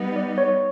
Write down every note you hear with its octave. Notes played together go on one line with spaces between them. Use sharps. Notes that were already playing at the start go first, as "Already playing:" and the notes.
Already playing: G3 B3 D#4
D5
C#5